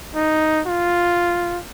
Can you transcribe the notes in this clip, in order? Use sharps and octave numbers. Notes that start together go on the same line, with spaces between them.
D#4
F4